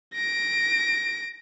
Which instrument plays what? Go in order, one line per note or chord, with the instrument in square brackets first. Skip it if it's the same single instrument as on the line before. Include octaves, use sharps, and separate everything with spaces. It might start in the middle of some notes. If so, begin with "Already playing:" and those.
[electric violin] A#6 D7